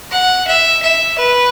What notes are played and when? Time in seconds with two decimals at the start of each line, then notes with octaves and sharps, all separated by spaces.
0.12 F#5
0.47 E5
0.83 E5
1.18 B4